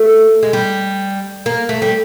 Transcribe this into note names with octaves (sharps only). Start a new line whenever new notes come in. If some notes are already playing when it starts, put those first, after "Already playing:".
Already playing: A3
G#3
G3
A#3
A3
G3